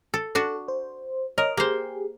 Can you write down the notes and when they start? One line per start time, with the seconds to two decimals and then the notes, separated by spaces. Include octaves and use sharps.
0.14 A4
0.35 D4 F#4 A4
0.68 C5
1.38 A#4 C#5 D#5
1.57 A#3 G4 G#4 C5